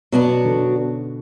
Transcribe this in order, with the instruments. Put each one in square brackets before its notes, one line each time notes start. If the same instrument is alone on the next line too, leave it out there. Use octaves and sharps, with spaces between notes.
[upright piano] B2 [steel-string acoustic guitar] F#3 B3 D4 F#4
[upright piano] D3